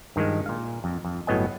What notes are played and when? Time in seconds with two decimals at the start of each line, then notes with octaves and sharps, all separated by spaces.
0.16 G2 D#3 F3 G#3
0.46 A#2 F5
0.84 F2
1.05 F2
1.27 G1 A2 F#3 B3 D#5 G#5